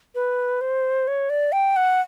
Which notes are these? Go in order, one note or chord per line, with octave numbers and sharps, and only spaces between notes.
B4
C5
C#5
D5
G5
F#5